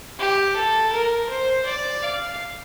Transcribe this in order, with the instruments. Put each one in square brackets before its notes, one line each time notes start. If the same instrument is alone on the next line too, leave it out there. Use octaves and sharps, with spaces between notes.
[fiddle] G4
A4
A#4
C5
D5
F5